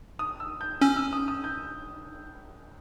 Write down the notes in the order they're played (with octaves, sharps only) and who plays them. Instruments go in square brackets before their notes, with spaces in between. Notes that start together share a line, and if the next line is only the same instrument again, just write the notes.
[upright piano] D#6
E6
G6
[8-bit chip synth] C#4 [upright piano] E6
[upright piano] E6
D#6
D#6
G6